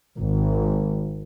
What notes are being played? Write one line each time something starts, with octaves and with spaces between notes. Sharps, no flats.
G#1